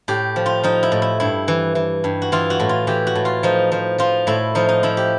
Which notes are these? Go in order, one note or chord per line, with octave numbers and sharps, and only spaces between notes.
A2 G4
F3
F4
F3 D#4
E4
A2
E4
G2 E4
E3
E3
G2
F#4
E3 F4
F#4
A2
F4
E3 G4
F#4
A2
F4
F3 D#4
F3
F3 F4
A2 E4
F3 D#4
D#4
F3 E4
G4